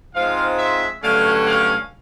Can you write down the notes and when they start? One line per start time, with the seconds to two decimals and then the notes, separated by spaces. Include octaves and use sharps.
0.15 G#2 F3 G#3 C4 F5
0.59 E5
1.02 G2 D3 F#3 A3 C#4 F5
1.47 F5